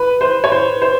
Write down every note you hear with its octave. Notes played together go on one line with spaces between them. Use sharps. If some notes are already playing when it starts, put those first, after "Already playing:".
Already playing: B4
C5
C#5
C5
C5